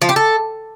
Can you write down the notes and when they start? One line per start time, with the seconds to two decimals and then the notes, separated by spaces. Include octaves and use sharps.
0.02 F3
0.09 G4
0.16 A4